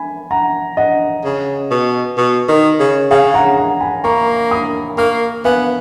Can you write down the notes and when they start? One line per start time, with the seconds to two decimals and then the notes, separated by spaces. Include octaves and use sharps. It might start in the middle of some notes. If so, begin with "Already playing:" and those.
Already playing: G#5 B5
0.31 F#5 A#5
0.77 D#5 F#5
1.24 C#3
1.71 B2
2.17 B2
2.48 D#3
2.80 C#3
3.10 C#3 F5 G#5
3.34 F#5 A#5
3.57 F#5 A#5
3.80 G#5 B5
4.04 A#3 A#5 C#6
4.51 B5 D#6
4.97 A#3 C#6 F6
5.45 B3 F5 G#5